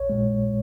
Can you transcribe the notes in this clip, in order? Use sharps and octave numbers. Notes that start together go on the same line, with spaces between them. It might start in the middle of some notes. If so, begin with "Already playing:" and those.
Already playing: A#1 C#5
A#2 G#3